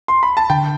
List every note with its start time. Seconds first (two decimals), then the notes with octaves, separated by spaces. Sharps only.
0.08 C6
0.23 B5
0.37 A5
0.50 D3 G5